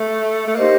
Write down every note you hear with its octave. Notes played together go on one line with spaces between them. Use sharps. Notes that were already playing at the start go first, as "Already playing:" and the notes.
Already playing: A3
A3
A#3 D#4 G4 C5 D#5